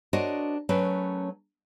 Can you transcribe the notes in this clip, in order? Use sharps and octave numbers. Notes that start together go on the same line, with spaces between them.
D4 F#4 A#4 C5 C#5 D#5
F#3 A3 C#4 A#4 B4